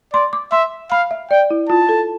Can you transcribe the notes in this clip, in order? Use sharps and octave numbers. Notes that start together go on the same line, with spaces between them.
D5 C6
D6
E5 C6
F5 B5
E5
D5 G5
E4
F4 A5
A4